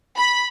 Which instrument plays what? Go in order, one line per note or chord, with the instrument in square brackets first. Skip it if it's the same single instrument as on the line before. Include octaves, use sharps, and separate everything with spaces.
[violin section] B5